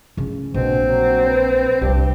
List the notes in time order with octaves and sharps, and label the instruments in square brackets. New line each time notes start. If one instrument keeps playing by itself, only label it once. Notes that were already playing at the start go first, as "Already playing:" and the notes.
[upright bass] C#3 C#4
[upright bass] A#1 [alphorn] B2 [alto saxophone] C4
[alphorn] F#3
B4
[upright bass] C2 [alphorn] G2 [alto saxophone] G4